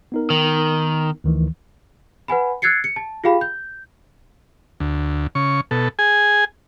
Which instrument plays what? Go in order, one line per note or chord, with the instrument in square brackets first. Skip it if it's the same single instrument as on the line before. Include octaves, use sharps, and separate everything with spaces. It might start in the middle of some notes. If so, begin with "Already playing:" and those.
[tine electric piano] B3 D#4 A#4
[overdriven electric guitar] D#3
[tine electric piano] D2 D#3 E3
[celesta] B4 F#5 G#5 B5
E6 F#6 G#6 A6 C7 C#7
C#7
A5
F4 G4 G#4 F5 G5 B5
G6
[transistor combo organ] D2
C#3 C#6
B2 A4
G#4 G#5